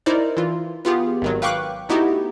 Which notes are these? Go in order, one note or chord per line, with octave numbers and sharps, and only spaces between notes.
D#4 E4 A#4 C5 D5
E3 F4
B3 F4 G4 G#4
G#1 D#3 F#3
B4 F5 G5 C#6 D6 F#6
A3 B3 D#4 E4 F#4 G4